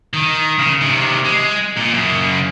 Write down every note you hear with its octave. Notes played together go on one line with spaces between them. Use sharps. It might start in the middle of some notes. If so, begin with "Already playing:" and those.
D#3
C#3
C3 D#3
G#3
A#2
F#2 C#3